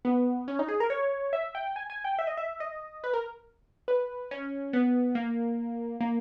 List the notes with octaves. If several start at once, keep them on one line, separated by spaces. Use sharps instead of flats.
B3
C#4
D#4
G#4
A#4
C#5
E5
G5
G#5
G#5
G5
E5
D#5
E5
D#5
B4
A#4
B4
C#4
B3
A#3
A#3